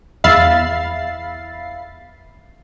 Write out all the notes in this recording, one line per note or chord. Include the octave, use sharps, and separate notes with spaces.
E2 E5 F5 B5 A6 C7